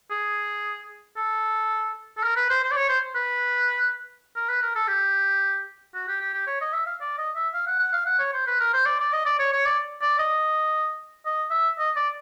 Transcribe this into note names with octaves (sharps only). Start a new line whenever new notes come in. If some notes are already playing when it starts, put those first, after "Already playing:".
G#4
A4
A4
A#4
B4
C5
C5
D5
C#5
C5
B4
A#4
B4
A#4
A4
G4
F#4
G4
G4
G4
C#5
D#5
E5
F5
D5
D#5
E5
F5
F#5
F#5
F5
F#5
C#5
C5
B4
A#4
C5
D5
D5
D#5
D5
C#5
C#5
D5
D5
D#5
D#5
E5
D#5
D5